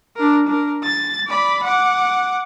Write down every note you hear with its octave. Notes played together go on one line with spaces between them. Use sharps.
D4 A#4
D4 A#4
A6
D5 B5
F#5 D6